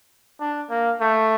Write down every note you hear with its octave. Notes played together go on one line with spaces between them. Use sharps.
D4
A#3
A3